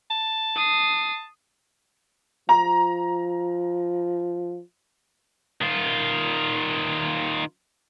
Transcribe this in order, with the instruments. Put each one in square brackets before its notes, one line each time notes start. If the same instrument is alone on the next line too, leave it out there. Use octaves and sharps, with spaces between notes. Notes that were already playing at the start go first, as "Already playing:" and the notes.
[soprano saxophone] A5
[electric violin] D#6 C7
[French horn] F3 [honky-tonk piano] A#5
[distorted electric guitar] D#3 F4